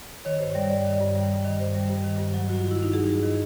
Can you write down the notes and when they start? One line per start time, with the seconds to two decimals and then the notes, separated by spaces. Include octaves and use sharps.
0.25 D#3 C#5
0.40 G2 C5
0.55 G3 D5
0.70 G2 D5
0.85 D#3
1.00 G2
1.15 G3
1.30 G2
1.44 D#3
1.59 G2 C5
1.75 G3
1.89 G2
2.04 D#3
2.19 G2
2.34 F#3
2.48 G2 F#4
2.60 D#3 F4
2.71 E4
2.78 G2 D#4
2.93 F#3 G#4
3.09 G2
3.23 D#3